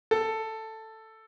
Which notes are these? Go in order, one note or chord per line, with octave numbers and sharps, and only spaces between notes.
A4